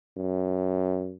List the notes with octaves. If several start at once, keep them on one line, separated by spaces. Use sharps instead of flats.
F#2